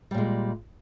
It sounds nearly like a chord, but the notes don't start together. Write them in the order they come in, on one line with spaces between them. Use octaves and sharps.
G3 A#2 G#3